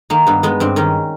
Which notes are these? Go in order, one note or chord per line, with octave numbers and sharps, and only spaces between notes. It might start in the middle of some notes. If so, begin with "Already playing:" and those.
D#3 A#3
G2 B3
G#3 B3
G2 C4
D#3 C#4